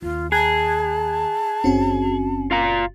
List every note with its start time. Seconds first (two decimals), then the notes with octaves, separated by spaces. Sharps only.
0.02 D#2 F4
0.32 G#4 A5 A#5 F#6 G#6
1.64 F#1 C4 C#4 F#4
2.51 F4 F5 A#5